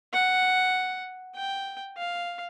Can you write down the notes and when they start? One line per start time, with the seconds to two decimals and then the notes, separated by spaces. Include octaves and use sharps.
0.13 F#5
1.36 G5
1.98 F5